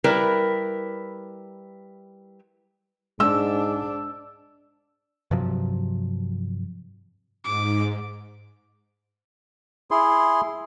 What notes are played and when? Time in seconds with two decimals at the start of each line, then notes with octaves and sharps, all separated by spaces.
0.04 G3 E4 A#4 B4
3.20 G#2 G#3 D4 E6
5.31 G2 C3 F3 F#3
7.45 G#2 D6
9.91 E4 G#4 C6